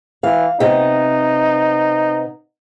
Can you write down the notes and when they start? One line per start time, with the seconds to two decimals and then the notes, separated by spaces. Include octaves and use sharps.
0.23 E3 F5
0.60 C3 B3 D#4 D#5